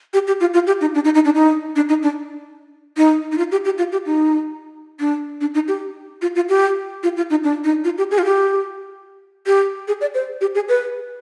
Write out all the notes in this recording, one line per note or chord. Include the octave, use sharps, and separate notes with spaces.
G4
G4
F4
F4
G4
D#4
D4
D#4
D#4
D4
D#4
D4
D#4
D4
D#4
D#4
F4
G4
G4
F4
G4
D#4
D4
D4
D#4
G4
F4
F4
G4
F4
F4
D#4
D4
D#4
F4
G4
G#4
F4
G4
G4
G#4
D5
C5
G4
G#4
B4